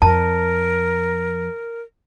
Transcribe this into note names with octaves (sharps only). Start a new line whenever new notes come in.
F2 A#4 A5